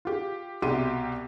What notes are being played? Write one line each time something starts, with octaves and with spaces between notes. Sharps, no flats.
F4 G4
C2 B2 G4 E5 C6 D#7